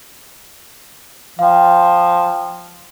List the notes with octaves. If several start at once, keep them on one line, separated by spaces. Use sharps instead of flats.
F3 F5 G5